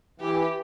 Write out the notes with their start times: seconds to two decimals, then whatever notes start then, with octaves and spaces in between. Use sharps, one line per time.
0.20 E3 G4